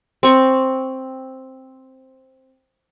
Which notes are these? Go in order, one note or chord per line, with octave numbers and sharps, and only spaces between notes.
C4 C#6